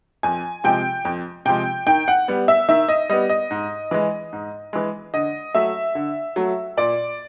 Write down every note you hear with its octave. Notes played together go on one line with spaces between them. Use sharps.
F2 G#5
C3 F3 G#3 G5
F2
C3 F3 G#3 G5
D#3 G5
F#5
G3 B3
E5
D#3 E5
D#5
G3 B3 D#5
D#5
G#2
E3 G#3
G#2
E3 G#3
D3 D#5
F#3 A3 E5
D3
F#3 A3
A#2 D5